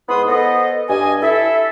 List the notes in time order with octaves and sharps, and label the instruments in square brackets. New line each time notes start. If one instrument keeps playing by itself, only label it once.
[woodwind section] G#2 B3 E4 B4 C6 D#6
B3 A4 C5 D#5
G2 D#5 G#5
E4 A4 E5